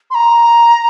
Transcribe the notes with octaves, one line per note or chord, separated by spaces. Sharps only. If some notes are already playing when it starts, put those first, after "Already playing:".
C6
A#5